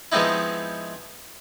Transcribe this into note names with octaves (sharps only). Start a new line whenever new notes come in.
F3 G#3 B3 C4 D#4 E4